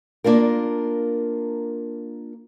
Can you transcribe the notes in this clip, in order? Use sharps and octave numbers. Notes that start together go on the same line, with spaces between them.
A#3 D4 F4 A#4